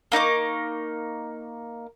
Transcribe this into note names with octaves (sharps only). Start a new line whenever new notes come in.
A#3 D#4 C#6 D6